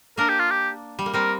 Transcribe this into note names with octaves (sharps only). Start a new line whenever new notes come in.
A#3 D4 A#4
G4
F4
G4
G3
A#3
G3 C4 A#4